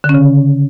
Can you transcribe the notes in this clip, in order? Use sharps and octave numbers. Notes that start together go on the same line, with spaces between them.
D3
C#4
C#3